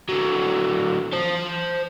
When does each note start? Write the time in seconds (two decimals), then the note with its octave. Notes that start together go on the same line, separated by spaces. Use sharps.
0.09 D3 F#3
1.12 C5 A5